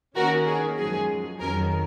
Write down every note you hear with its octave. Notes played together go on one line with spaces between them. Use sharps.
D#3 A#3 C#4 F#4 A#4
G#4
F#2 F3 G#3 C#4 G#4
F2 D#3 F#3 C#4 F#4 A#4